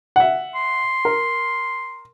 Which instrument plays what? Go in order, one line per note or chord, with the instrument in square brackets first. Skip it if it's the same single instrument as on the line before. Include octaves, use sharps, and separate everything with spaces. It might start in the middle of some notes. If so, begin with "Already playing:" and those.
[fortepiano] E5 F#5
[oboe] C6
[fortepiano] A#4